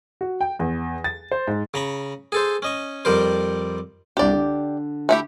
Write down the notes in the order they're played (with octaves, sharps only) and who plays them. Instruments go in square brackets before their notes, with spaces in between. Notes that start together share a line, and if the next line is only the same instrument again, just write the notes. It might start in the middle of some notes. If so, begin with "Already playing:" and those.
[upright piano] F#4
G5
E2
A6
C5
G#2
[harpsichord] C#3 A#5 B5 C#6
G#4 A4 C5
C#4 D#5 C#6
F2 G3 A#4 C5
[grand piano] C2 D4 [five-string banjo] G4 D5
[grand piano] D3
[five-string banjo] A3 E4 G4